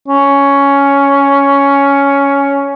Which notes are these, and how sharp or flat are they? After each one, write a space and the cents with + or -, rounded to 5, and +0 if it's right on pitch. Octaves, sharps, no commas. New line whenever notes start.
C#4 +10